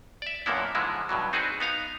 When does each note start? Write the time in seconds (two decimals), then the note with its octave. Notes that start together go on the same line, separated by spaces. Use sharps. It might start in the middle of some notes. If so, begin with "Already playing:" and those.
0.22 D5 E5
0.46 F#2 A#2 D3 A#3 B3 E4
0.75 G#2 D3 E3 F3 G#3 E4
1.09 G2 B2 E3 F#3
1.33 C4 D#4 F#4 G#4 B4
1.60 B3 D#4 F5 A#5